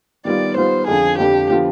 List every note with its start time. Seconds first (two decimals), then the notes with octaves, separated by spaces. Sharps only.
0.25 D#3 G3 B3 F4 D5
0.56 D#3 G3 B3 F4 C5
0.87 F2 D3 F3 G#4
1.18 F2 D3 F3 G4
1.50 D3 F3 B3 F4